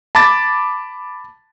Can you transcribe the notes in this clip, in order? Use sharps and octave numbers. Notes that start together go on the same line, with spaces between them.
A5 B5 D6 A6